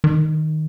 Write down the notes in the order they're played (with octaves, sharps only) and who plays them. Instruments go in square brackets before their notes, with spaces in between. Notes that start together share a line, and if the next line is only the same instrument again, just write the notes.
[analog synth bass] D#3